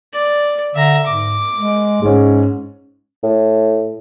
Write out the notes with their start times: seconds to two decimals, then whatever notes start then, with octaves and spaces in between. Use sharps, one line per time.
0.13 D5
0.75 D3 E5 A#5
1.06 G#2 D6
1.56 G#3
2.02 G#2 G#3 C#4
3.23 A2